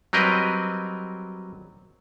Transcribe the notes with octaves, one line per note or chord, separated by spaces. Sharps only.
F#3 G3 C4 A#4 B4 D#5